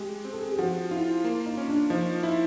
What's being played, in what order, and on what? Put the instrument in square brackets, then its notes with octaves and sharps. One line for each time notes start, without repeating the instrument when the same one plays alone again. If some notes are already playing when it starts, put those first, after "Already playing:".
Already playing: [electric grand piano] G#3 [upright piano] G4
[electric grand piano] C4
[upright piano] A4
G#4
G4
[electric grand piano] F3 [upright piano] F#4
[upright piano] E4 [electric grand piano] F4
[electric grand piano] A#3
[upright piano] D#4
[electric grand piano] C#4
[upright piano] D4
[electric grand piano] F3 [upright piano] D#4
[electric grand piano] E4